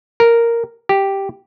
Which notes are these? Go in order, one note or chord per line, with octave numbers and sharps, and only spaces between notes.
A#4
G4